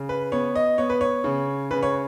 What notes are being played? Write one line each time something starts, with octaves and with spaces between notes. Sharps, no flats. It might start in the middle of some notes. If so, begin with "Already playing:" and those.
Already playing: C#3
B4
B3 C#5
D#5
B3 C#5
B4
C#5
C#3
C#3 B4
C#5